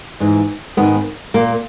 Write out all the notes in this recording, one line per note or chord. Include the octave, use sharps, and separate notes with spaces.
G#2 E3
G#2 D#3 B3
A#2 A#3